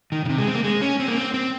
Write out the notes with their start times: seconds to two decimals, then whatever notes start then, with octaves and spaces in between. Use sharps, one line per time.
0.12 D#3
0.25 C#3
0.29 C3
0.38 G#3
0.47 C4
0.55 A#3
0.64 G#3
0.81 C#4
1.00 C4
1.08 A#3
1.17 C4
1.34 C4